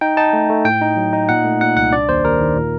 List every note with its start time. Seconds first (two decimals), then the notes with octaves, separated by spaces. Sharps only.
0.01 D#4 G5
0.17 D#4 A5
0.33 A3
0.49 A3
0.65 A2 G5
0.81 D#4
0.97 F#3
1.13 D#4
1.29 A#2 F#5
1.44 A3
1.61 A#2 F#5
1.76 C2 F#5
1.93 D4 D5
2.09 D#2 C5
2.24 D#2 A#4
2.40 D#3
2.56 A#2